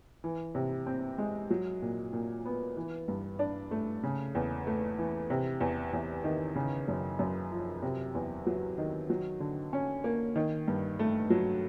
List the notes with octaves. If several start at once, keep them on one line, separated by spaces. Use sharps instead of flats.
E3
C3
C4
G#3
F#3
A#2
A#2
B3
E3
G2
D4
A3
C#3
E2
A3
E3
C3
E2
E2
D#3
C#3
F#2
F#2
F3
C3
E2
F#3
D#3
F#3
D3
C#4
A#3
D#3
G2
A3
F#3